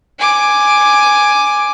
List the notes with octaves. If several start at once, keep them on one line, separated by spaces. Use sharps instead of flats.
G#5 D6